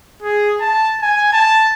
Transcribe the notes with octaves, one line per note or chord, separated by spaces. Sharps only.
G#4
A5
G#5
A5